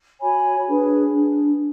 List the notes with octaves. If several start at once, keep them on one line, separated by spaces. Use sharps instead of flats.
F#4 C#5 G#5 B5
D4 G#4 B4
D4